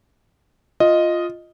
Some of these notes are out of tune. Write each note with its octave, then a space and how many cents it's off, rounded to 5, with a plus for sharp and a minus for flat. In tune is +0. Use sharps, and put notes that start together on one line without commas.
F4 +0 D#5 +0